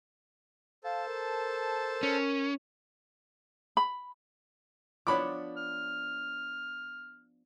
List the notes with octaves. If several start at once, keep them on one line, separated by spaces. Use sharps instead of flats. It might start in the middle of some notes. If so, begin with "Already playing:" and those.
A4 C5 F5 A5
A#4
C#4
B5
F3 B3 D4 C#5 B5 D6
F6